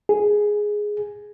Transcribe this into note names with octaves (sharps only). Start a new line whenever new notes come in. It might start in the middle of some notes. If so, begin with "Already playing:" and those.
G#4